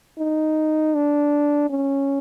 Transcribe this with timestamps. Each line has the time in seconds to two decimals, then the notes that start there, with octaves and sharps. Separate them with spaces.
0.19 D#4
0.95 D4
1.70 C#4